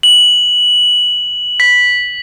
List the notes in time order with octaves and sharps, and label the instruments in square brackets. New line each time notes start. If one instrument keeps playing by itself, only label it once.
[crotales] F#7
B6